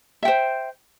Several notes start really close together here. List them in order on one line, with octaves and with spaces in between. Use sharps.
E5 G5 C5